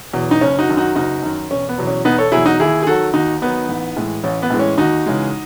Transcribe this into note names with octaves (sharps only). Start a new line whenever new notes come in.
E2 B2 F#3
D#4
F#1 C#4
D#4 F#4
F#2 D#3
D#4 F#4
F#1 D#4 F#4
F#2 D#3
E1 C#4
B3
E2 B2 F#3
C#4
E1 B3 D#4
A4 C#5
E2 B2 F#3 E4 G#4
D#4 F#4
D#2 E4 G#4
G#4
D#3 F#3 F#4 A4
D#2 D#4 F#4
D#3 F#3 B3 D#4
A1
A2 E3 G#3
A1 C#4
B3
A2 E3 G#3
C#4
D#2 D#4 F#4
C#3 E3 G#3